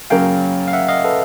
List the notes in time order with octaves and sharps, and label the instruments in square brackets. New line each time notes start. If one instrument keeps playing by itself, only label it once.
[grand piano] F#2 C#3 F#3 A#3 C#4 [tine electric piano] F5 G5
[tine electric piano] F5
E5 F#5
D#5 F5
A4 B4